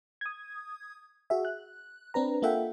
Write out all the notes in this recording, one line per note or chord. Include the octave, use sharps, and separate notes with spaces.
D#6 G#6
F#4 G#4 E5
F#6
C4 D4 B4 A#5
A#3 F4 A4 E5 F#5 G5